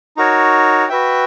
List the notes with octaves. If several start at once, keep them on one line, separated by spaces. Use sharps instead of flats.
D#4 F#4 A#4 C#5
F#4 B4 E5 G5